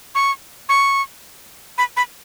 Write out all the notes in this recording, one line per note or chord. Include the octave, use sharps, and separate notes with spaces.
C#6
C#6
B5
B5